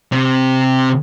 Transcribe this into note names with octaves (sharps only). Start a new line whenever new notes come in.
C3